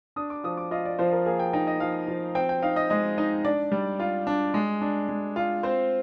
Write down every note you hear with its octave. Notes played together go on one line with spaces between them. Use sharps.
D4 D#6
D6
F3 D#6
D6
F4 D#5
D5
F3 C5
A#4
A#3 G#4
G5
D#4 G5
D#5
F3 F5
F3
C4 G5
G5
D#4 F5
D#5
G#3 D#5
D#4
D4 D5
G3
F4
D4
G#3
D4
G#3
F4
C4 C5